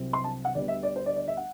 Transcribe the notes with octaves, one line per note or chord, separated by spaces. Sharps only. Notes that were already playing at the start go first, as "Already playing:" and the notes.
Already playing: C2 C3 F#3 C4
C6
A5
F#5
D2 D3 G3 B3 D5
E5
D5
C5
D5
D5
E5
F#5